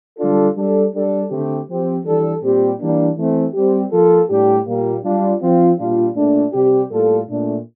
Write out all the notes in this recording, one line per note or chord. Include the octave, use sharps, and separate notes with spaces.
D3 G3 D4 F4 A4
G3 D4 A4
G3 D4 A4
D3 A3 C4 G4
F3 C4 G4
E3 G3 D4 A4
A#2 G3 C4 G4
E3 G3 A#3 D4
E3 A3 C4
G3 C4 G4
F3 A#3 F4 A4
A2 G3 D4 G4
A#2 G3 A#3
G3 D4 F4
F3 C4 F4
A#2 G3 D4 F4
A#2 A3 D4
C3 G3 C4 G4
A2 G3 A#3 F4 A4
A#2 A3 D4